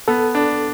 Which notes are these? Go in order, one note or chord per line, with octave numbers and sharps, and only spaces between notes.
B3 A4
D4